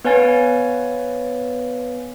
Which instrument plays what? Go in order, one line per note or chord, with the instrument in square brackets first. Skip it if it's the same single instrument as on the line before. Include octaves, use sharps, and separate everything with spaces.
[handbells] B3 B4 C#5 F5 G#5 A6